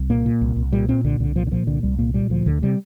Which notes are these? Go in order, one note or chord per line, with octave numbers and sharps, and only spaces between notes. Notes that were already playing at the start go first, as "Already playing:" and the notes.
Already playing: C2
A#2 A#3
A#2
C2
C2
A#2 G3
A#2 C4
C2 D3
C2 D3
A#2 F3
D3
A#2 F3
C2 D3
C2 G3
A#2 A#3
A#2 G3
D2 F3
D2 D3
C3 G3